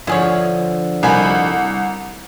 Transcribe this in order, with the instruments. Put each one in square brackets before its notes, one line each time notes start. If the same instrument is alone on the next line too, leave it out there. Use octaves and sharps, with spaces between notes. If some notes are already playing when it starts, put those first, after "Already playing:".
[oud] D3 F3 [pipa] E4 G#4 C#5
[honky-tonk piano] C2 [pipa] D#3 G#5 B5